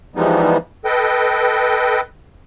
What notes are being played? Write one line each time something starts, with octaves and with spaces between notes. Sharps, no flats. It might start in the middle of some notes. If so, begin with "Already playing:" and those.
E3 F3 G3 G#3 B3 D#4
A4 B4 D#5 G5